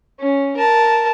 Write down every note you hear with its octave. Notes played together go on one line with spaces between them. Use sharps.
C#4
A#4 A5